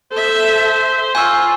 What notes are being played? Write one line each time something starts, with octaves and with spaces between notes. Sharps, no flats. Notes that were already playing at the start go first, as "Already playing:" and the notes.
A4 C5 E5
F4 G#5 C#6 E6